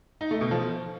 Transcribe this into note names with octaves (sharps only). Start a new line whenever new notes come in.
D#4
A3
B2
F3